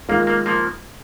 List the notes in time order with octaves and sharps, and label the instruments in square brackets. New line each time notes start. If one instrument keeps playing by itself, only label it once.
[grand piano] D#3 G#3 F4 [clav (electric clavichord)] A#3
[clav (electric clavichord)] A#3
F3 A#3